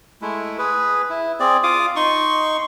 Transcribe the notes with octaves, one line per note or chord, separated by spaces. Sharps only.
G#3 A3 E4
G#4 B4
E4
C4 G#4 D5
F4 D6 D#6
D#4 C6 C#6